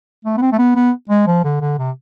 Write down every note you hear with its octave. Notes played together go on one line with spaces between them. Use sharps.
A3
B3
C4
A3
B3
B3
G#3
F3
D3
D3
C3